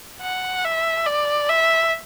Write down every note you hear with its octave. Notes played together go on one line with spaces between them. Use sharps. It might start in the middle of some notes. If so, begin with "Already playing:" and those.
F#5
E5
D5
E5